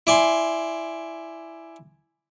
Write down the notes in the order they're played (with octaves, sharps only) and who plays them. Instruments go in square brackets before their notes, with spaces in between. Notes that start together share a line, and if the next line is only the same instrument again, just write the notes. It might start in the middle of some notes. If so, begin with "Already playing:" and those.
[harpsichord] E4 D5 G#5 C6